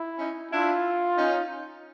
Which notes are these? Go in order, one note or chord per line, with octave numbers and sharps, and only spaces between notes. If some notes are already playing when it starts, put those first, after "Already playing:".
Already playing: E4
C#4 D#4
D4 E4 F4
C#4 D#4